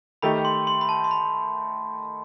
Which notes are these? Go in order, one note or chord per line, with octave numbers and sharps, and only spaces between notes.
D#3 A3 D#4 G4 B5
C6
C6
B5
A5
C6
B5